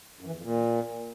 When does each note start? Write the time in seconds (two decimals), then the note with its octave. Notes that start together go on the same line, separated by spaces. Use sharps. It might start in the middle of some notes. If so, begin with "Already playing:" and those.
0.21 F#2
0.26 E3
0.32 E2
0.37 F2
0.43 A#2